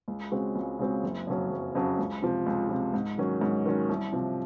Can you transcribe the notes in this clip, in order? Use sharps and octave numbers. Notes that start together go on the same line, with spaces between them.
C#2
C#3 G#3 C4 F#4
C#2
C#3 G#3 C4 F#4
F#1
F2 C#3 F#3 C#4
F#1
F2 C#3 F#3 C#4
C#2
C3 F3
C#2
C3 F3
G#2
D#3 F#3 C#4
G#2
D#3 F#3 C#4
C2
C3 F3